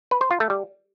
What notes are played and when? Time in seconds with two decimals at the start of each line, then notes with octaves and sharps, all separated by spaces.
0.11 B4
0.21 C5
0.31 F4
0.40 A3
0.50 G3